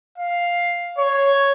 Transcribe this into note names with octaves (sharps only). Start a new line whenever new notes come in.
F5
C#5